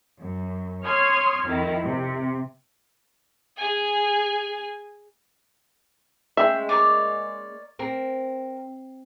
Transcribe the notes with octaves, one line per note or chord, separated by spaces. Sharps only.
F#2
C#5 C6 D#6 F6 G#6
F2 D#3 E4
C3
G#4 G#5
G#3 A#3 C#4 E5 G5
A#4 C#5 D5
C4 A#4